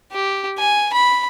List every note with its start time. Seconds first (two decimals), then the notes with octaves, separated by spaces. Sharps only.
0.12 G4
0.58 G#5
0.93 B5